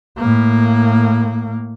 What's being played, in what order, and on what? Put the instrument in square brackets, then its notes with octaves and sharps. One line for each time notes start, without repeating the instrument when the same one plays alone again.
[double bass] A2 A#3